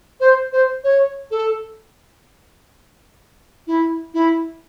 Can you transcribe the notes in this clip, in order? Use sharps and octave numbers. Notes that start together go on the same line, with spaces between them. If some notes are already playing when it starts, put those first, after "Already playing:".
C5
C5
C#5
A4
E4
E4